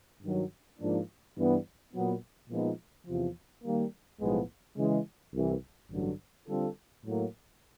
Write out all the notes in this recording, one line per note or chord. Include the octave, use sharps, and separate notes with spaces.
G2 D#3 F#3
G#2 F3 A#3 D4
G2 E3 G3 B3
A#2 F#3 B3
A#2 F3 G#3 B3 D#4
E2 C3 F3
D#3 G3 A#3
B1 A2 F3 G#3 B3
C#3 E3 G#3
C2 C3 E3
A1 G2 D3 F#3
D3 G3 C4 F4 A4
A2 F#3 A#3